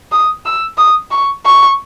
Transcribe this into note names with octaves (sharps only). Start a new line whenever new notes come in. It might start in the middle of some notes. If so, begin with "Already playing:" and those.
D#6
E6
D#6
C#6
C#6